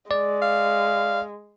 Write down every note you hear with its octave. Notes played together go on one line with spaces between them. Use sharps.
G#3 D5
F5